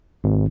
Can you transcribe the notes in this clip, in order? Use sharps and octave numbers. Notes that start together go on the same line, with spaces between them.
G#1